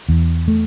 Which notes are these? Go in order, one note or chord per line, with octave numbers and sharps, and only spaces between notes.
E2
A3